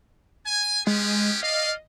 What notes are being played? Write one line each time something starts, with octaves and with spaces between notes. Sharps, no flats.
G#5
G#3 B3 C#4 G4
D5 D#5 F5